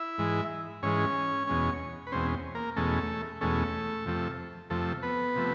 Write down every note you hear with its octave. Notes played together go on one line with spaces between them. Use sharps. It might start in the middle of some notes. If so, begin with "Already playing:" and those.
Already playing: E4 E5
G#2 E3 G#3
G#2 E3 G#3 C#4 C#5
E2 B2 G#3 C#4
B4
E2 B2 G#3 C4 C#4 C5
A#3 A#4
E2 B2 G#3 A3 C#4 A4
E2 B2 G#3 A3 C#4 A4
F2 C3 F3 A3
F2 C3 F3 A3 A4
B3 B4
C3 F3 A3